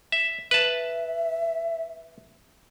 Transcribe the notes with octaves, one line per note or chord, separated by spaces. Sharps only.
E5
B4 E5 A5